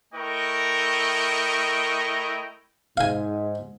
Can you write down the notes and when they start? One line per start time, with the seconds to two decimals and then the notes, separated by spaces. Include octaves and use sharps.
0.13 A3 E4 A#4 D#5 G5 C#6
2.97 G#2 F5 G#5